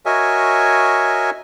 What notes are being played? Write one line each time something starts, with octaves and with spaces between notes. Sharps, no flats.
F#4 A#4 C#5 D#5 E5 G#5